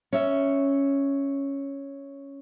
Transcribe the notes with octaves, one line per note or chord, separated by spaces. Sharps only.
C#4 E5